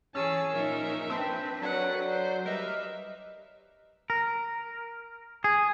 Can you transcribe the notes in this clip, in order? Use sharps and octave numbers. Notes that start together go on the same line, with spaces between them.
E3 C#4 G#4 C#5 A5 E6
A#2 F3 D#4 A#4 E5
C4 D4 B4 A5
F#3 A4 D5 F#5
C5
G3 A#4 B4 D#5 E5
A#4
G#4